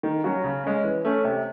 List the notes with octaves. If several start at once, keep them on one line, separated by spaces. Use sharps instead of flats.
D#3
F#3 C#4 F#4
C#3
G#3 C#4
E3
A3 C#4
C3